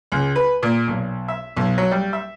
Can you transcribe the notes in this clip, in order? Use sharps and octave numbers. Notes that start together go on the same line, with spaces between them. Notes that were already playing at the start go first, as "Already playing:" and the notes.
C#2
B4
A#2
B1
E5
B1
F#3
G3
E5